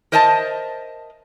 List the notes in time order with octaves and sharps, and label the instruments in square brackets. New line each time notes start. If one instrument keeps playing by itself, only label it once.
[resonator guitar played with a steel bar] A#4 C5 D#5 E5 G5 A5